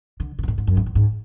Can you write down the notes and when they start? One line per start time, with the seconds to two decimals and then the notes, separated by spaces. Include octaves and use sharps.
0.20 D3
0.39 B2
0.43 G#2
0.48 A2
0.58 G#2
0.67 F#2
0.77 G#2
0.86 A2
0.95 G#2